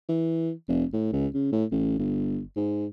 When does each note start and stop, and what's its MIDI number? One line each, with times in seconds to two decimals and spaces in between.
0.09 0.51 52
0.68 0.84 29
0.93 1.08 45
1.13 1.27 37
1.34 1.49 49
1.52 1.65 45
1.71 1.96 33
1.99 2.41 31
2.56 2.86 44